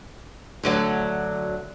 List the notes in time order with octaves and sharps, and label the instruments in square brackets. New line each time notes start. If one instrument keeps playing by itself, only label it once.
[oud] D2 D3 F#3